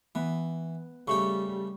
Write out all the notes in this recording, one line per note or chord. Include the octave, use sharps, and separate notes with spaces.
E3 B3
C#3 G3 A3 G4 C#6